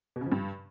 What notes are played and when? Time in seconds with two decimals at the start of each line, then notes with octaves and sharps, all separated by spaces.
0.16 B2
0.21 C#3
0.26 F3
0.32 G2